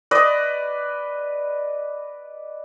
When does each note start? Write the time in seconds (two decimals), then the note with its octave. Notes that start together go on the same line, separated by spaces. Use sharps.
0.11 B4 D5 D#5